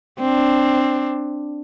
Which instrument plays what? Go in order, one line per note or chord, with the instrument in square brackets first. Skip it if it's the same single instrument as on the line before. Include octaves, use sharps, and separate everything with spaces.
[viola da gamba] C4 D4